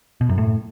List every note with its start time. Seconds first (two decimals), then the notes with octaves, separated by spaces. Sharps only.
0.21 B2
0.29 F#2
0.38 A2